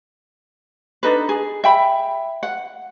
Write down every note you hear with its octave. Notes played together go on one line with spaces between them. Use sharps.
D4 D#4 A4 B4
G#4
E5 G5 B5
F#5